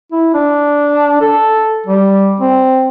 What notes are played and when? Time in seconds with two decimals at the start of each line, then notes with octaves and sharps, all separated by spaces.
0.12 E4
0.34 D4
1.21 A4
1.87 G3
2.41 C4